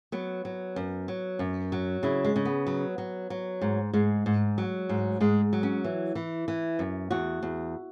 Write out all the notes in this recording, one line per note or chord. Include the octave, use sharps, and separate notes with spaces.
F#3 B3
F#3
F#2
F#3
F#2
F#3
C#3 E4
G#3
C#3
B3
F#3
F#3
F#3
G#2
G#2 G#3
G#2
F#3
G#2
G#2 G#3
F#3
C#4
E3
E3
E3
F#2
E2 F#4
E2